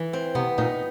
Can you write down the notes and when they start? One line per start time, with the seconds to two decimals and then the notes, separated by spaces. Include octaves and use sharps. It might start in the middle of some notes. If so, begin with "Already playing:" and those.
Already playing: E3
0.13 C4
0.35 C3 B3
0.58 A#2 D#4